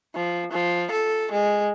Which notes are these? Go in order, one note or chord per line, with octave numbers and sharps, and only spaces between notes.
F3
F3
A4
G#3